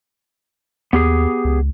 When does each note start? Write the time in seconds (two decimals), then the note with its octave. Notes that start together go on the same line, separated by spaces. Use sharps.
0.93 D#2 B3 G4 G#4
1.45 C#2